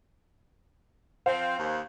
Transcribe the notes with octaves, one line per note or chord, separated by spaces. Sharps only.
F3 C4 C5 F5
D#2